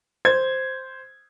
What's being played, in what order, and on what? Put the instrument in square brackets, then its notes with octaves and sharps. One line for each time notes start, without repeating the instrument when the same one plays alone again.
[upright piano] C5 G#6